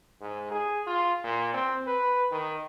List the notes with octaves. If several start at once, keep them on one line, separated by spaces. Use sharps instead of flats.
G#2
G#4
F4
A#2
C4
B4
D#3